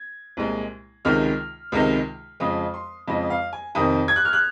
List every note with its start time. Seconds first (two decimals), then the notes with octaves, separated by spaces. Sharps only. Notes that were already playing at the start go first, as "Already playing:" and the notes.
Already playing: G#6
0.37 C2 A#2 G#3
1.05 C#2 C3 D#3 G#3 F6
1.72 C#2 C3 D#3 G#3
2.40 F2 C#3 F3 G#3 D#6
2.74 C6
3.08 F2 C#3 F3 G#3 D#5
3.30 F5
3.53 G#5
3.75 F2 C3 D#3 D#6
4.08 G#6
4.16 F#6
4.25 F6
4.33 F#6